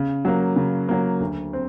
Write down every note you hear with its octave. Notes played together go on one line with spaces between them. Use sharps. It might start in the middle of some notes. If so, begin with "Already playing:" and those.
Already playing: C#3
F#3 A#3
C#3
F#3 A#3
D2
C4